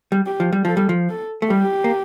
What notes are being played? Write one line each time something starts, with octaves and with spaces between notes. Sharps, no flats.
G3
G4
F3
G3
F3 A4
G3
F3
A4
A3
G3 G4
A#3